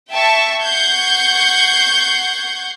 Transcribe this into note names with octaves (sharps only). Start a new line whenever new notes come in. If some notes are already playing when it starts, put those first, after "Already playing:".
E5 G5 A5 C#6
F#5 C#6 G6 G#6 C7